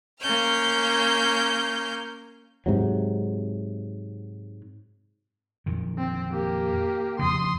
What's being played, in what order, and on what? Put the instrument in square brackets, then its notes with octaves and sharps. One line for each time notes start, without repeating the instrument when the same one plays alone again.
[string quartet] A#3 C#4 F6 G6
[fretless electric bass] G#2 C3 F#3
[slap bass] F2 A#2 D#3
[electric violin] C4
A#3 G4
[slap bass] F2 C#3 [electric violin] C6 D#6